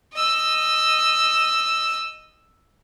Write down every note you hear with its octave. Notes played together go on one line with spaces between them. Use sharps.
D#5 E6